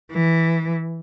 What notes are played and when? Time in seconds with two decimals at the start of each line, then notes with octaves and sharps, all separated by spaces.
0.12 E3